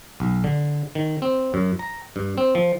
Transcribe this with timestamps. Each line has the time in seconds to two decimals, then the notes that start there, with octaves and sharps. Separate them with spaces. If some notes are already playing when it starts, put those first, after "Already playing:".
0.20 B1
0.44 D3
0.95 D#3
1.22 C4
1.54 F#2
1.79 A#5
2.16 G2
2.38 C4
2.55 F3